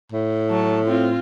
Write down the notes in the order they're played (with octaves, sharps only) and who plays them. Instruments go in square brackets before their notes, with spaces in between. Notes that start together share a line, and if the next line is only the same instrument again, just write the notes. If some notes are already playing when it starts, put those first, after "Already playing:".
[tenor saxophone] A2
[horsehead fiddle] F#3 A5
C4 F4